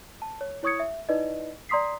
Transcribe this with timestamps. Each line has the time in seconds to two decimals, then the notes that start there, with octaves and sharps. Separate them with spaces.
0.22 A5
0.41 C#5
0.63 E4 C#5 C#6 D#6 G#6 C#7
0.80 E5
1.09 D#4 E4 B4 D5 D#5
1.69 D5 A#5 C6 D#6 B6 C7